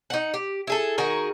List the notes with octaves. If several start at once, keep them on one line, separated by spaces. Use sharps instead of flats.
D#4 F#5
G4
E4 G#4 A4
D#3 F#4 G#4 A#4